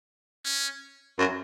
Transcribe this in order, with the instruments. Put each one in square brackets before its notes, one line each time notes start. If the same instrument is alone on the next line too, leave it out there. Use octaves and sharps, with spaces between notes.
[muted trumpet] C#4
[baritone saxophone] F#2